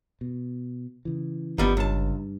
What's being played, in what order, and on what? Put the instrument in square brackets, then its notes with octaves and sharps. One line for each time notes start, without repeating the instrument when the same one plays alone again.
[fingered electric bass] B2
C#3 E3
[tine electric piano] G1 [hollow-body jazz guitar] D#3 G3 B3
[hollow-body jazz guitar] C#2 A5 [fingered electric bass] G2